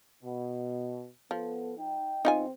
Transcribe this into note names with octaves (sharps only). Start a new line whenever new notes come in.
B2
F3 B3 A4
D#4 G5
E2 C4 D#4 F4 G#5